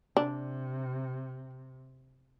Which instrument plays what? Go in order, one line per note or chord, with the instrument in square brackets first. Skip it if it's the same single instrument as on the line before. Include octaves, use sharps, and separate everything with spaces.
[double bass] C3 [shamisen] D4